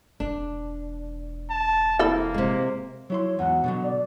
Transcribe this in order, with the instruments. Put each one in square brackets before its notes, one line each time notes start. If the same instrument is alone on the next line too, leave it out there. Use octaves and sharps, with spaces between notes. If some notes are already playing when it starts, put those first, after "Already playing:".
[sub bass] E1 [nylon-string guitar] D4
[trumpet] A5
[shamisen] E3 C4 A4 [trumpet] A#3
[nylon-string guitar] C3 G#3
[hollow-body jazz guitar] F#3 E4 C6 [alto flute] C#5
[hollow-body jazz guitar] E2 G#2 F#4 [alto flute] F#5
[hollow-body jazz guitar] B2 D3 F#3
[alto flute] D5